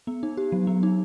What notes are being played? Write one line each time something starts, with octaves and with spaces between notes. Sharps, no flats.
B3
D#4
G4
F#3
B3
D#4